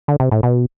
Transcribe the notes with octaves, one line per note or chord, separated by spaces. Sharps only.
D3
C3
A2
B2